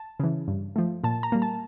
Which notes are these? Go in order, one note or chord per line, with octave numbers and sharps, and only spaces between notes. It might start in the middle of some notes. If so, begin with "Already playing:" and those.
Already playing: A5
C#3 E3
G2
F3 A3
A#2 A5
A#5
G3 A#3
A5